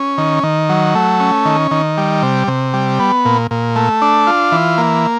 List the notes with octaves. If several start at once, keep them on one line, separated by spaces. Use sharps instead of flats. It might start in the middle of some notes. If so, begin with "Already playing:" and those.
Already playing: C#4
D#3
D#3
F#3
A3
C#4
D#3
D#3
G3
C3
C3
G3
B3
A#2
A#2
A3
D4
F4
E3
A#3